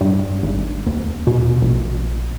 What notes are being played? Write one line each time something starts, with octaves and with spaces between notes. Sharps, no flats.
G2
G#1
D#2
B2
A#1